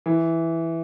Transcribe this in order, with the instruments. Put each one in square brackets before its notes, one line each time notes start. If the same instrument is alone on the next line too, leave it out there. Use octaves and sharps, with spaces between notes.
[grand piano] E3